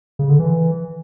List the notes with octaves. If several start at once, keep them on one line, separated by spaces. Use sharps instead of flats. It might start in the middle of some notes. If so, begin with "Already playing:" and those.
C#3
D3
E3